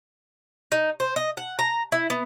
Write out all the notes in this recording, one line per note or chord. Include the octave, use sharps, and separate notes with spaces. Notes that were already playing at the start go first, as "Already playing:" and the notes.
D#4
C5
D#5
F#5
A#5
E4
B3